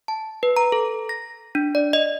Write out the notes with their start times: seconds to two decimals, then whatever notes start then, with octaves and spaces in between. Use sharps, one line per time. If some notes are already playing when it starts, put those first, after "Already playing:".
0.08 A5
0.43 B4
0.57 A#5
0.72 A4
1.09 A#6
1.55 D4
1.75 D5
1.93 D#5